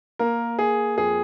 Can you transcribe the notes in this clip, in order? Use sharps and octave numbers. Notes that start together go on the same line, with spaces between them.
A#3 A#4
A#3 G#4
F2 G#4